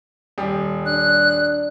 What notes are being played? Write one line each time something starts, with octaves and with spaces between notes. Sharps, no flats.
D#1 G3 G4
D4 F#6